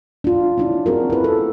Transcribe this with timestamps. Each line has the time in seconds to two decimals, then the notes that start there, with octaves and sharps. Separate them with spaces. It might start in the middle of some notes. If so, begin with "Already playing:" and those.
0.24 D4 F4
0.58 C#4 D4 E4
0.86 C4 D4 F#4 G#4 A#4
1.10 E4 B4
1.24 A4